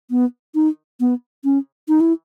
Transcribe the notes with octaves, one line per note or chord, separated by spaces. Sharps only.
B3
D#4
B3
C#4
D#4
E4